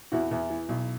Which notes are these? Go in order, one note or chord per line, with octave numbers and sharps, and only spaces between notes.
E2 E4 F#4
E2
E3
B1